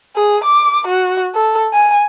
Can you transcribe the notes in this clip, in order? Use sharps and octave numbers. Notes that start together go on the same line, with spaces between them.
G#4
D6
F#4
A4
G#5